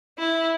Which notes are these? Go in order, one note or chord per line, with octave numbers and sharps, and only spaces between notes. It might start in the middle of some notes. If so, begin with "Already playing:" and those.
E4